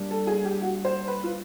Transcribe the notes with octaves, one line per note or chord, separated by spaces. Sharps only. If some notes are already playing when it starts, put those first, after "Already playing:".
Already playing: G3 A#3 D4
A4
G#4
G4
F#4
C5
B4
F4